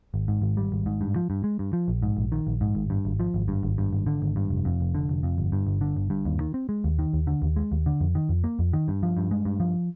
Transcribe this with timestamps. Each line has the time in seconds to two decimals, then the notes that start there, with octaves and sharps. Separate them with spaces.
0.14 G#1
0.28 G#2
0.42 G#1
0.57 G3
0.72 G#1
0.86 G#2
1.01 G2
1.16 F3
1.30 G2
1.44 G#3
1.59 G2
1.73 F3
1.88 A#1
2.03 G#2
2.17 A#1
2.32 D#3
2.47 A#1
2.61 G#2
2.75 G#1
2.90 G2
3.05 G#1
3.20 F3
3.34 G#1
3.48 G2
3.63 G#1
3.78 G2
3.93 G#1
4.07 D3
4.22 G#1
4.36 G2
4.50 F1
4.65 F2
4.80 F1
4.95 D3
5.09 F1
5.23 F2
5.38 G1
5.52 G2
5.66 G1
5.81 D3
5.96 G1
6.10 G2
6.25 D#2
6.41 D#3
6.54 C4
6.69 G#3
6.84 D#2
6.99 D#3
7.13 D#2
7.27 D3
7.42 D#2
7.56 G#3
7.72 D#2
7.86 D3
8.01 F2
8.15 D#3
8.29 F2
8.44 A#3
8.59 F2
8.73 D#3
8.88 G2
9.03 F3
9.17 G2
9.31 G#3
9.45 G2
9.60 F3